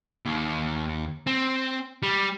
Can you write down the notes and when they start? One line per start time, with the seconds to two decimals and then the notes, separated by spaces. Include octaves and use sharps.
0.25 D#2
1.27 C4
2.02 G3